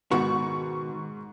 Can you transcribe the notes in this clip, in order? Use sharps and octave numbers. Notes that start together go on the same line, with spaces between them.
G#2 B2 D#3 F#4 C#6